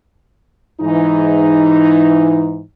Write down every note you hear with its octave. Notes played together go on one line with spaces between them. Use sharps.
G#2 E3 D#4